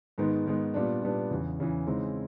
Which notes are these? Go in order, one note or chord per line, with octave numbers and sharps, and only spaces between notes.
G#2 D#3 G#3 B3
G#2 D#3 G#3 B3
A#2 G3 B3 D4
A#2 G3 B3 D4
E2 C#3 E3
E2 C#3 E3
C#3 E3 G#3 C4 D#4